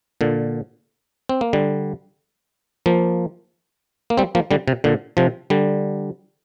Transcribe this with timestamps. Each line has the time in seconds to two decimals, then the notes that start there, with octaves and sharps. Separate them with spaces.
0.21 A#2 D3
1.29 C4
1.41 A#3
1.53 D3 G3
2.86 F3 A#3
4.10 A#3
4.17 G3 C4
4.35 F3 A#3
4.51 D3 G3
4.68 C3
4.84 A#2 D3
5.17 C3 F3
5.50 D3 G3